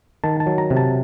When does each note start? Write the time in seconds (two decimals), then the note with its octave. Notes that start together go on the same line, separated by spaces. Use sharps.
0.24 D#3 A5
0.40 A5
0.47 F#3
0.58 A#5
0.70 C3
0.77 A5